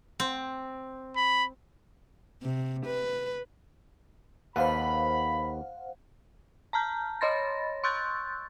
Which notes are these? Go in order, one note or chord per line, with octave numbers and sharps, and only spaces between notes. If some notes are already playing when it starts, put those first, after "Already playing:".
C4
B5
C3
B4
D#2 A4 B4 C5 F5 F#5 B5
A5 A#5 F6 G6
C#5 D#5 B5 C6 A6 A#6
C6 C#6 E6 F#6 G6 A6